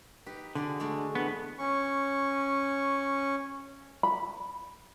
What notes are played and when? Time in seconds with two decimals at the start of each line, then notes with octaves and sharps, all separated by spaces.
0.26 D#4 G4 B4
0.55 D3 F#4 G#4 D5
0.80 G#3 A3 D5
1.15 G2 E3 B3
1.59 C#4 C#6
4.03 B5